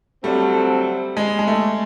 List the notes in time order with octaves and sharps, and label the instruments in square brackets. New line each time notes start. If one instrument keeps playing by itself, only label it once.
[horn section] D3 F#3 A3 C4 [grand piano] G3
[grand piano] G#3
G#3
A3